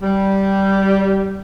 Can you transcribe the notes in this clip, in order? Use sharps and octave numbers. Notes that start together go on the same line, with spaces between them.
G3